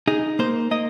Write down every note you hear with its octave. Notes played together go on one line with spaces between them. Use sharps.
D#4 G#4
A#3 C5
A#3 D#5